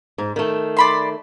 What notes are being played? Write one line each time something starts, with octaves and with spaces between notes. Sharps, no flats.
G#2
D#3 A3
D5 B5 C6